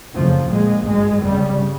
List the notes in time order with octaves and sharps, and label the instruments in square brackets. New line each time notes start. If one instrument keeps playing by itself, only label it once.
[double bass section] F#1 F2 C#3 F3
A#1 A#2 G#3
G#1 G2 G#3
G1 F2 C#3 G3